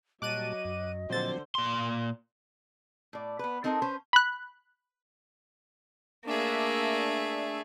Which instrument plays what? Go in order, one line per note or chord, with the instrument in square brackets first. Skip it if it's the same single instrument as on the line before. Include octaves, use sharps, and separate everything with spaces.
[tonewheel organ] A#2 G3 A5 [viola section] F#3 [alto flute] D#5 [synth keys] D6 F#6 D#7
[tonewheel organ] F#2
[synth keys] A#2 A6 [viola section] D3 C5 [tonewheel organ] F3 F#3 C4
[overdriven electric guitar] A#2 C6
[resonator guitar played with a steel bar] A2 D5
B3 B4
C4 D#4 A4 A#4 C5 D#5
C#4 B4 C5
[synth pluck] B5 F#6
[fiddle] A3 G#4 [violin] A#3 [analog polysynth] D4 E5